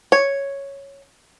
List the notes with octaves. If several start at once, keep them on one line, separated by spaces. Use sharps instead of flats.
C#5